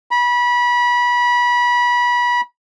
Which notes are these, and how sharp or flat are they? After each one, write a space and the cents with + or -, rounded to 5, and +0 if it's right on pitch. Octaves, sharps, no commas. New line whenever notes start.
B5 -25